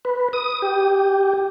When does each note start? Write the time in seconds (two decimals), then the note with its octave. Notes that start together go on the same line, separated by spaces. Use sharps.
0.05 B4
0.33 D#6
0.62 G4